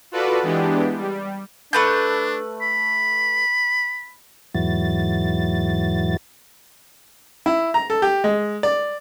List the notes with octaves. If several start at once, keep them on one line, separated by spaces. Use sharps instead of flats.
F4 F#4 A4 B4 D5
E3 G#3 B3 D4 G4
G3
A3 D4 B4 G6
B5
E2 G#2 E3 F#3 A6
E4
A#5
A4
G4
G#3
D5